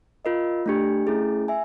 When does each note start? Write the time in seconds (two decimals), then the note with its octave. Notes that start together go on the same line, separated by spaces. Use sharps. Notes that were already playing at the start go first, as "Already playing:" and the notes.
0.25 F4 A#4 D#5
0.66 A3 D4 G4
1.07 A3 C#4 E4 G#4
1.48 E5 G#5